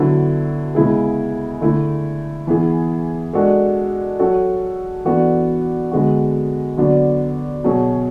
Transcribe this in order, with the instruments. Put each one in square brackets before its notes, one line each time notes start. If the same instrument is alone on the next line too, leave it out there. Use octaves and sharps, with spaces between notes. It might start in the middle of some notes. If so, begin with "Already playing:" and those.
Already playing: [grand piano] D3 F#3 B3 E4 A4
C#3 G#3 B3 E4 G#4
D3 A3 E4
E3 B3 E4 G#4
G#3 D4 F#4 A4
F#3 C#4 F#4 A4
E3 B3 D4 F#4 A4
D3 G#3 B3 F#4
D3 F#3 B3 D4
B2 F#3 C#4 G#4